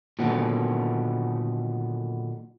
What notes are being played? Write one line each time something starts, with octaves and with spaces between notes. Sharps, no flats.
A#2 D3 D#3 F#3 G3 B3